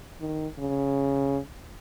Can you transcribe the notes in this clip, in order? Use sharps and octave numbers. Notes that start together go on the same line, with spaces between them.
D#3
C#3